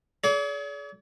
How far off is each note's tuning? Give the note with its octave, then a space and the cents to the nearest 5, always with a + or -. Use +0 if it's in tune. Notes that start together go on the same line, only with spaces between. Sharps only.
G#4 +40 D5 -45